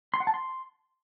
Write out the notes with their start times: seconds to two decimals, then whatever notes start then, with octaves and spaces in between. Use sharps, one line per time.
0.14 C6
0.20 F#5
0.27 A5
0.34 C6